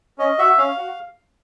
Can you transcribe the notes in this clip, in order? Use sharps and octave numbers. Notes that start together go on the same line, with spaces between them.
C#4 D#5
F#4 E5
C#4 F5
F#4